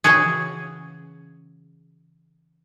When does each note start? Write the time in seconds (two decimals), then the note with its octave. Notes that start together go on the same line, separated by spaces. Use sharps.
0.04 C#3 E3 C#4 F#4 G#4